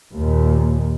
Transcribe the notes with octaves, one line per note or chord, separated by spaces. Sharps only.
D#2 A#2